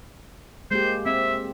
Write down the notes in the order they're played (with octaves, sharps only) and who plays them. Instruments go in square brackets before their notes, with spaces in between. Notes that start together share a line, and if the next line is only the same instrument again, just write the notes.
[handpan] G#3 A#3 G4 [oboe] C5
[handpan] C4 [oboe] E5